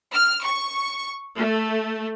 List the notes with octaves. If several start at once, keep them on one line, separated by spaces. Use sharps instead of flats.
F6
C#6
A3